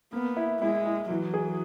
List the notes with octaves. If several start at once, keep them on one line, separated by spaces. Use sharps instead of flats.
A#3 B3
E4
G#3 E4
E4
E3 F#3
G#4